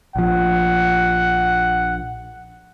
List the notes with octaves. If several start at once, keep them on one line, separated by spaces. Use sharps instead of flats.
A#1 F3 F#5